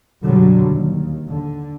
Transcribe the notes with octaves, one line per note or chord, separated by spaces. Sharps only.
F#2 B2 D3 F#3 G3
D#2
D3